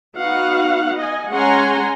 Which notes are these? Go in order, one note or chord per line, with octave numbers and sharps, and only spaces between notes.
B3 D#4 F#4 F5 F#5
D#5 G#5
G#3 C#4 F#5 G#5 A#5 C6